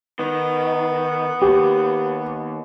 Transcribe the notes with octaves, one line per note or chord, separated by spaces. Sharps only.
D#3 B3
D#2 G4